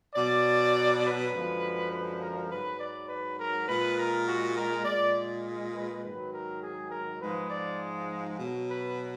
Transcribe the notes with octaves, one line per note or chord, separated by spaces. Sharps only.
B2 F#3 D5
B4
F#2 D3 F3 G#3
B4
A#4
G#2 F#3 B4
D5
B4
A#4
A#2 G#3 B4
A#4
F#4
A#4
A#2 G#3 D5
B4
G#2 D#3 F#3 B4
A#4
G#4
A#4
G#2 F3 G#3 B4
D5
B2 F#3
B4